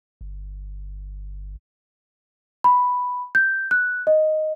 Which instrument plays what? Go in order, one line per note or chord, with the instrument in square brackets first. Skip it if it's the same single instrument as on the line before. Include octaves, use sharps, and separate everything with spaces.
[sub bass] G1
[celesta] B5
G6
F#6
D#5